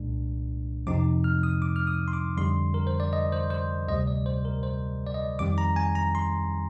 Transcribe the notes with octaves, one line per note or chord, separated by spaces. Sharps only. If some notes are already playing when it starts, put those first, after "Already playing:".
Already playing: C2 A#2 G#3 D4
F2 C3 F3 C4 D#4 D6
F6
D#6
D6
F6
D#6
C6
D6
F2 D3 G3 C6
A#4
C5
D5
D#5
C5
C5
D2 C3 G3 D#5
D5
C5
A#4
C5
D5
D#5
F2 D#3 G3 C4 D6
A#5
G#5
A#5
C6